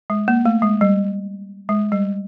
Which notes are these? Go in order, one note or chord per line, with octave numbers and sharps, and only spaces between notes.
G#3
A#3
A3
G#3
G3
G#3
G3